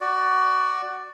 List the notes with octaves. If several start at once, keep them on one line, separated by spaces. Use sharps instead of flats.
F#4 D5